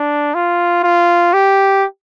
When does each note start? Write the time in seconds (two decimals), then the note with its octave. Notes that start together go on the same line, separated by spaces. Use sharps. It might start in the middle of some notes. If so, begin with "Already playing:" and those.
Already playing: D4
0.34 F4
0.84 F4
1.33 G4